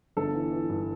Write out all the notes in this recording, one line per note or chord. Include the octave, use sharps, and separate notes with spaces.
G1 A4
E3
E3
G2